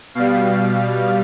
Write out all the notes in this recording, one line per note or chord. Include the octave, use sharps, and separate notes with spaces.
B2 G3 F5